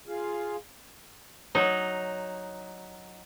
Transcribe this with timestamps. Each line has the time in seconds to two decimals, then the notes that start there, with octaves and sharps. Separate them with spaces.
0.07 F4 G#4 F5
1.55 F#3 D#4